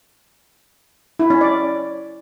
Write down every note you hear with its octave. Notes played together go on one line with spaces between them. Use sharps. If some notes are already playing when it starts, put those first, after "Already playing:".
E4
C#4
D5